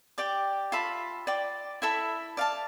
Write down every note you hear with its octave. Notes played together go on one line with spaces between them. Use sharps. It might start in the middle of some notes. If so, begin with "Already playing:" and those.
G4 D5 G5 D6
F4 A4 E5 B5
D5 G5 D6
E4 A4 E5 B5
D5 F5 A5